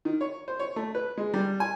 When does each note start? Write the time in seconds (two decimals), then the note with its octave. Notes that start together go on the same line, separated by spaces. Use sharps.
0.05 D#3
0.21 C#5
0.48 C5
0.59 C#5
0.76 A3
0.95 B4
1.17 G#3
1.34 G3
1.60 G#5